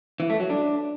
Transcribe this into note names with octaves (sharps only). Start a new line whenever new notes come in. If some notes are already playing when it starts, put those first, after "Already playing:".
E3
A3
F#3
D4